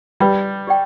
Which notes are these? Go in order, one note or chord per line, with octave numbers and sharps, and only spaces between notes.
G3 B4 D5 G5 B5
G4 D5 G5